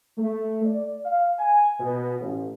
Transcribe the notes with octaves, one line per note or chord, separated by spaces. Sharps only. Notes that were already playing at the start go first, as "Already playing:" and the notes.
A3
D5
F5
G#5
B2
A1